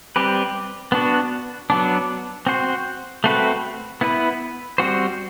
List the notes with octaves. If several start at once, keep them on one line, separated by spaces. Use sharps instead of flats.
G3 C4 G4 B4
B3 D4 F#4
F#3 B3 D4
C4 F#4 C5
A3 C4 F#4 B4
B3 E4 B4
G3 C4 F#4 C5